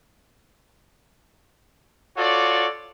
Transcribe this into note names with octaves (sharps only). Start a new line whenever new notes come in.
F4 F#4 A4 C#5 D5